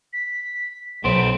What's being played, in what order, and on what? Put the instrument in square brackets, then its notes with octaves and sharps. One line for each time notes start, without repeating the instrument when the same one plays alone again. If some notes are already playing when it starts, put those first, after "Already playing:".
[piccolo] B6
[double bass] B1 [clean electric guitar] B3 C5 [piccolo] D7